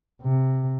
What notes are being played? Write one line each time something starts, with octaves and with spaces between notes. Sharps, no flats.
C3